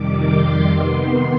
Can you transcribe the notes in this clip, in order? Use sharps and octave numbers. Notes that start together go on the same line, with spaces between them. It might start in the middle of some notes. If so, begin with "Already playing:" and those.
Already playing: F2 C3 D#3 G3 D6
C6
C3 D#3 B3 C6